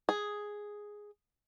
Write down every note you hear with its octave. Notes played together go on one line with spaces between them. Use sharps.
G#4